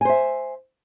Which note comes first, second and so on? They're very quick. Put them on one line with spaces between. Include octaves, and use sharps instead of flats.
G#5 C5 E5